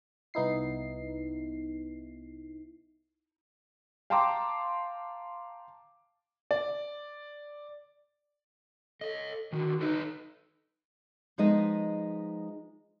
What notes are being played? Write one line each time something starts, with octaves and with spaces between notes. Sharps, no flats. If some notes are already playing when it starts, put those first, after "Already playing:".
C2 B3 D#4 E4 C7
F5 G5 A5 A#5 C6 D6
D5
A4 C#5 D#5
D3 D#3 F#4
D#4 A4 B4 D#5
F3 G#3 B3 D#4 D#5